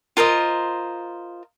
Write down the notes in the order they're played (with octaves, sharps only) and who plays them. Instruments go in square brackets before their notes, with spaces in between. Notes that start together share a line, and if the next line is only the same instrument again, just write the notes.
[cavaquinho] F4 A#4 C5 D#5